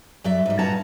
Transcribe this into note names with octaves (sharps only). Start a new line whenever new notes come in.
F#2 F#3 D5 E5
G#2 G3
G2 A#2 C#4 F#5 A5 A#5